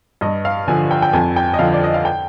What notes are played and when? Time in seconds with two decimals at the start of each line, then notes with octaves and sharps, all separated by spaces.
0.21 G2 D#5
0.45 F5
0.68 D3 F3 G#5
0.91 G5
1.02 G5
1.13 F2 G#5
1.36 G5
1.54 D#5
1.59 D3 F3 F5
1.74 D5
1.84 D#5
1.94 F5
2.05 G5